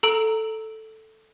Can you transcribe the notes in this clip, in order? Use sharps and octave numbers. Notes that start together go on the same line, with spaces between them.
A4 A#5 E6 D7 F#7